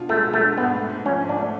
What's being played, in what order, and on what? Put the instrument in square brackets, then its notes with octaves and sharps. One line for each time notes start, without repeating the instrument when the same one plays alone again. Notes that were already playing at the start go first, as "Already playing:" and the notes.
Already playing: [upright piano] B2 D4 F4
[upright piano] G#3 [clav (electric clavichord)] A3
[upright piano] B2
[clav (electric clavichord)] A3
[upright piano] D4
[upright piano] G#2 [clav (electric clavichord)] B3
[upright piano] A3
G#2
[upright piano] F3 [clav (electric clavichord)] C#4
[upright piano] G#2
[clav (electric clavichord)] D4
[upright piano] A3